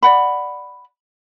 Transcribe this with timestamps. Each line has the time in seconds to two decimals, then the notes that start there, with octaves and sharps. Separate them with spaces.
0.03 D5 F#5 B5